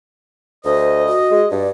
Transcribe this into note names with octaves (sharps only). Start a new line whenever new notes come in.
D2 C5 D#5
F#4
G#3
G2 D5